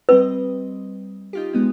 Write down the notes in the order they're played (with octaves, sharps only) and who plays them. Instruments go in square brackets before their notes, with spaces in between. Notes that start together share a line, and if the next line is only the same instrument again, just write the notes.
[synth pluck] G3 C4 D#5 [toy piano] B4
[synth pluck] D#4 F4 G4
G#3 B3 D#4